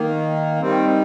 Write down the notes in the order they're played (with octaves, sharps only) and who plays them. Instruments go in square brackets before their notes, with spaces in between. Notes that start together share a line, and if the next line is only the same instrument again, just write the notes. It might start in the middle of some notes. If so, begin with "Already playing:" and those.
Already playing: [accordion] D#3 A#3
D#3 G3 C4